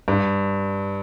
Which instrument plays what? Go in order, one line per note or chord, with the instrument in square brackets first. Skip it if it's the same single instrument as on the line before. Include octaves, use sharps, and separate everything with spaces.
[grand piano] G2